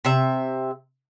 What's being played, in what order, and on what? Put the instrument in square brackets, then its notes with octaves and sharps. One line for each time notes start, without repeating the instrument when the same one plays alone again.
[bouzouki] C3 E5